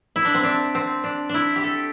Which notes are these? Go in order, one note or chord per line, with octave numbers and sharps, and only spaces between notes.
E4
D4
C4
D4
C4
D4
D4 E4
G4
A4